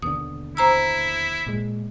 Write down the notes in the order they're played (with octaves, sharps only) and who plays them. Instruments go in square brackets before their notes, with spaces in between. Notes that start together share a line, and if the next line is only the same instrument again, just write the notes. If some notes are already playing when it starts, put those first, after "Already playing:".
[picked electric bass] D#2 B2 D3 [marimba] D#6
[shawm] E4 [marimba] C5 A#5 E6
[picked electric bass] A#2 G#3